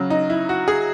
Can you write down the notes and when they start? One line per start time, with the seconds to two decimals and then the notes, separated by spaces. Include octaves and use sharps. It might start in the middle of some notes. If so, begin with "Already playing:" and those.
Already playing: C#3 F#3
0.10 D#4
0.30 E4
0.49 F#4
0.68 G#4